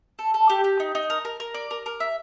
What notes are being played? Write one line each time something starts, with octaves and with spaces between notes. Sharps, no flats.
A4
A4
G4
G4
D#4
D#4
A#4
A#4
A#4
D5
A#4
A#4
E5